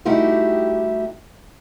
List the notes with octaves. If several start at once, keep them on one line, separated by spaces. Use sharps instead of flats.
G3 A3 D#4 E4 F#4 G4